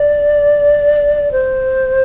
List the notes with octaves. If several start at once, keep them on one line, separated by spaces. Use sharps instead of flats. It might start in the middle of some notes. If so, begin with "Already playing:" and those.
Already playing: D5
C5